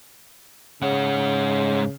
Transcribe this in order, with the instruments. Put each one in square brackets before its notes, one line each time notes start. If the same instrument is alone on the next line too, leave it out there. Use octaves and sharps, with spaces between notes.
[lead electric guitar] G#2 F#5 [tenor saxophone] C#3